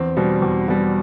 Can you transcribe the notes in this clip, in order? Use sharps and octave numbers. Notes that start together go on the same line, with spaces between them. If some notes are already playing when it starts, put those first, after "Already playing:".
Already playing: E2 C4
B2 G3
E2
B2 G3